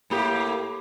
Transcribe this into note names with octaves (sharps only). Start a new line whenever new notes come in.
A2 A#3 G4